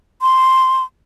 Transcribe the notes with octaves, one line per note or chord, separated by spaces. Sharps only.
C6